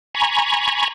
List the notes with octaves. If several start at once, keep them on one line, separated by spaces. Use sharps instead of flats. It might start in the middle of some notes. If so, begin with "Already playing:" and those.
G#5 A#5 B5 C#6